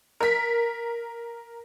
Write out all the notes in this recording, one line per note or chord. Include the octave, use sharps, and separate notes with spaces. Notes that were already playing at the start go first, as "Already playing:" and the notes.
A#4 B6